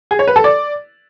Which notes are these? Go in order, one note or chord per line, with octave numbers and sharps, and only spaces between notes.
G#4
C#5
B4
A4
D5